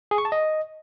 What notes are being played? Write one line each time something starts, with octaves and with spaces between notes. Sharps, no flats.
G#4
C#6
A5
D#5